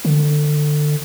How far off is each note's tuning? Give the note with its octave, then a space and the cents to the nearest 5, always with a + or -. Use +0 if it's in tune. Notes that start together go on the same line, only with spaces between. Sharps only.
D3 +20